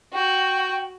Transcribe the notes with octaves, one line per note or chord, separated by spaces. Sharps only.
F#4 G5